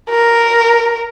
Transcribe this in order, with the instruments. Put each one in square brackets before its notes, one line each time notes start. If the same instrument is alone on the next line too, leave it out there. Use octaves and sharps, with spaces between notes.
[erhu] A#4